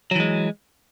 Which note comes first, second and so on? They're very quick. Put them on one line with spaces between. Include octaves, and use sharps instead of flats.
F#3 E3 G#3